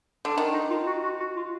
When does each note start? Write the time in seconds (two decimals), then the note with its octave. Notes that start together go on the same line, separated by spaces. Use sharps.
0.25 D3
0.37 D#3 D4
0.54 D#4
0.70 F4
0.87 F#4
1.03 F#4
1.20 F#4
1.37 F4